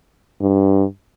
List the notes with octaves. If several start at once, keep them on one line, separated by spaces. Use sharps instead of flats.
G2